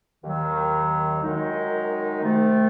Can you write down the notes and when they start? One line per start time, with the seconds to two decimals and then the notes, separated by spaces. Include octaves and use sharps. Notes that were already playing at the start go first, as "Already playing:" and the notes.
0.23 D#2 D#3 F#3
1.23 F#2 D#3 G#3 D#4
2.22 C2 C3 D#3 A3